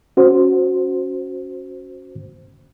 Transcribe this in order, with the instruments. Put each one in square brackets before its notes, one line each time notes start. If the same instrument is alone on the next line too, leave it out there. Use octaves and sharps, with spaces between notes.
[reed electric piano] C#4 F#4 C5